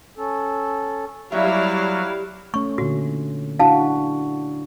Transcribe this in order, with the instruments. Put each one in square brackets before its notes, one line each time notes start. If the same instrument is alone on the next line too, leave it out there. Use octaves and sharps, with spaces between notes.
[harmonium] C#4 A4
[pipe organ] F#3 [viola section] G3 F5 [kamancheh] E4 [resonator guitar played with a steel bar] E5
[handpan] A3 C#4 [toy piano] C#6
[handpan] A#2 D3 [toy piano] F#4
[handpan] D4 E4 F#4 [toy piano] F5 A5